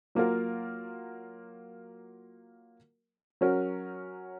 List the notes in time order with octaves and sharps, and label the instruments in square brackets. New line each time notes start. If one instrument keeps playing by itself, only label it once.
[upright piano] F#3 A#3 F4 A#4
F#3 C#4 F#4 A#4